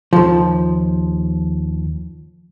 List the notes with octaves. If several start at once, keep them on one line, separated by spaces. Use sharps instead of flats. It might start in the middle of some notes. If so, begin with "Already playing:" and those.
D#2 F3